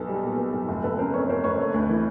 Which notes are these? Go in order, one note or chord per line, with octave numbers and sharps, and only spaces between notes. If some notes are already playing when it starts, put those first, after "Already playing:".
Already playing: B1 B3 A4
G3
A#2
B3
B1
F1
F1 A4 B4
C#3 A#4 C5
F2 B4 C#5
F1 A#4 C5
F1 B4 C#5
A3
D2
E3